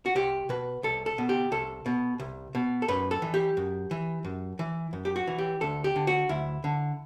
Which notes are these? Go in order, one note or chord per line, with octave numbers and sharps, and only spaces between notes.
F#4
C2 G4
B2 B4
C2 A4
A4
B2
G4
C2 A4
B2
C2
B2
A4
F#2 B4
A4
E3
G4
F#2
E3
F#2
E3
F#2
G4
F#4
E3
G4
D2 A4
G4
D3
F#4
D2 E4
D3